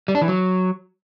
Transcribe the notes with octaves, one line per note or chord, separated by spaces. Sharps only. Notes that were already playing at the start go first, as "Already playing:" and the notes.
G3
D4
E3
F#3